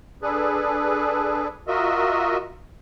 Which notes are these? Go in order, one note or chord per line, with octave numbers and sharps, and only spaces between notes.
D4 G#4 A4 B4
F4 F#4 A#4 D#5 E5